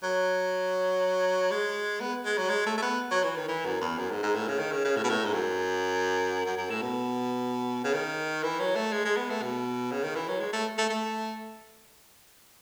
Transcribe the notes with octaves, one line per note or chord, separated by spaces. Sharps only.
F#3
G#3
B3
G#3
F#3
G#3
A3
A3
B3
F#3
E3
D#3
E3
F#2
E2
F#2
G#2
G#2
A2
C#3
D#3
C#3
C#3
A2
B2
A2
G#2
F#2
F#2
F#2
A2
B2
C#3
D#3
E3
F#3
A3
G#3
G#3
B3
A3
B2
C#3
D#3
E3
F#3
G#3
A3
A3
A3